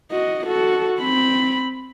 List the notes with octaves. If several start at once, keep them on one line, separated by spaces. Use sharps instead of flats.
F#4 D#5
F#4 A4
C4 B5